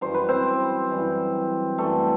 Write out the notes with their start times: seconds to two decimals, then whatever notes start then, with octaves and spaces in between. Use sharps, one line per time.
0.01 F#2 E3 G3 C5
0.14 B4
0.29 C4 C5
0.89 F#2 E3 G3
1.78 F#2 E3 G3 A3 A4